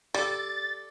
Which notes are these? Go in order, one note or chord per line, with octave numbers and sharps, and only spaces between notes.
G3 A4 D5 A6